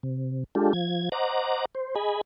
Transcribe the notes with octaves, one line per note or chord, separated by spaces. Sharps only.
C3
G#3 D4 F4 G4 A4
F3 G#6
C5 D#5 F#5 A#5 D6
C5
G#4 D#5 G#5 B5